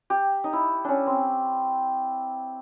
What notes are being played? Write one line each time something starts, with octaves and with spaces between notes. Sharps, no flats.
G4
D#4
E4
C#4 D4
C4